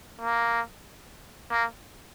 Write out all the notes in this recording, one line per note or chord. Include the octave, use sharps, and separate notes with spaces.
A#3
A#3